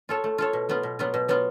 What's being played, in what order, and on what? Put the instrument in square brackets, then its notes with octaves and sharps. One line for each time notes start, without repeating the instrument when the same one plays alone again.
[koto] F4 A4 C#5
A3
F4 A4 C#5
B2
F#3 B3 F4
B2
F#3 B3 F4
B2
F#3 B3 F4